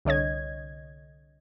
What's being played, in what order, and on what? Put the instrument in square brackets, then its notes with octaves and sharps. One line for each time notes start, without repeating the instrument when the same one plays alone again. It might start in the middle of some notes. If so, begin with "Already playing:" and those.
[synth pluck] C2 D3 C#5 D#5 G#6